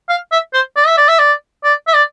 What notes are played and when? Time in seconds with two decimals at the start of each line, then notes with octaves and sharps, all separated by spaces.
0.09 F5
0.31 E5
0.53 C5
0.76 D5
0.87 E5
0.97 D5
1.08 E5
1.19 D5
1.64 D5
1.87 E5
1.94 D5